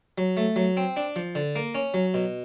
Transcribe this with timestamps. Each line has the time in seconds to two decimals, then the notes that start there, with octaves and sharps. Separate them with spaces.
0.18 F#3
0.37 A3
0.56 F#3
0.77 C4
0.97 D4
1.16 F3
1.35 D3
1.56 A#3
1.75 C#4
1.94 F#3
2.14 B2